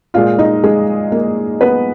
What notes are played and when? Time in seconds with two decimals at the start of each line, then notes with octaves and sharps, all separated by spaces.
0.14 A#2 G#3 F4 F5
0.38 D#4 D#5
0.64 G#3 G#4
1.12 A#3 A#4
1.61 B3 B4